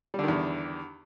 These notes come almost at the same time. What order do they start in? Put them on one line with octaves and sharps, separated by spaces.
G3 D3 D#3 E2